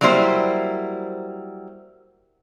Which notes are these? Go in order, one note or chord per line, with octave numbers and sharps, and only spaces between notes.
F#3 G3 A#3 E4 C5